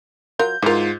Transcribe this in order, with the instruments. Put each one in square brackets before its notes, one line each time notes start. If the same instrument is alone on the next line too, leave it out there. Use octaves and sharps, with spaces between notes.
[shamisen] F#3 F4 A#4 [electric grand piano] G6
[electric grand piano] G#2 F4 [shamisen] E3 A#4